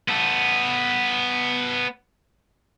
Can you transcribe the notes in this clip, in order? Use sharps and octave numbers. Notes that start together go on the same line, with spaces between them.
B3 A4